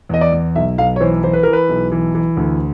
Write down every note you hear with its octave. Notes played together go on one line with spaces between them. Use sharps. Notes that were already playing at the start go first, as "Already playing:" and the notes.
E2 D#5
D5
E2
B1 E5
B1 F5
C#5
E3 C5
E3 C5
B4
E3 A#4
B4
B1
E3
E3
D2